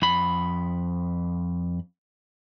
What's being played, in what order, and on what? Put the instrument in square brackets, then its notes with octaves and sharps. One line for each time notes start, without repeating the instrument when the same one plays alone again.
[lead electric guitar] F2 B5